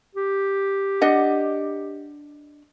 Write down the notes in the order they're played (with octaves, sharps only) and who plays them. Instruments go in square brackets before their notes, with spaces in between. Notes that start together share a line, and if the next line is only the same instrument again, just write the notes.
[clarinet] G4
[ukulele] D4 D#5 F#5